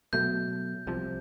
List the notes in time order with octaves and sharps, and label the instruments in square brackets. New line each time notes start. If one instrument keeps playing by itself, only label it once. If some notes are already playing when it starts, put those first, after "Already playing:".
[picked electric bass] B2 F#3 A3 [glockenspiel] G6
[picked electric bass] C2 C3 F3